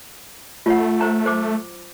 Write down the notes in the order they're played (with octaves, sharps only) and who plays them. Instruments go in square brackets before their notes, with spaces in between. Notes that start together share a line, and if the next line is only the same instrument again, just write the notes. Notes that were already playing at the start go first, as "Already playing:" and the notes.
[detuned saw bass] A3 [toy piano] F4 C#5 F#5
[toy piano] C5 A#5
C5 D6